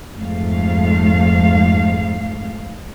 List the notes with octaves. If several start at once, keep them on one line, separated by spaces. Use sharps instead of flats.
F2 G#2 A3 F5